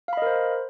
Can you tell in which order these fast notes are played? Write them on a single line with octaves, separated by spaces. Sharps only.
F5 B5 D#5 A#4 C5